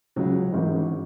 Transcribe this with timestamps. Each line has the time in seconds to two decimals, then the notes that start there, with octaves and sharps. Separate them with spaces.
0.16 C#2 C#3 F#3
0.52 G#1 G#2 E3